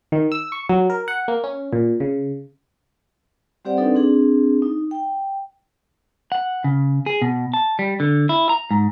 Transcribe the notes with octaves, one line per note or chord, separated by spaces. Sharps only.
D#3
E6
C#6
F#3
A#4
F#5
A#3
C#4
A#2
C#3
G3 C4 G4 C5 D5 F#5
C4 D4 D#4 A4 B4 D5
C4 D4 G#4
D#4
G5
F#5
C#3
G#4
B2
A5
G3
D3
E4
A#5
G#2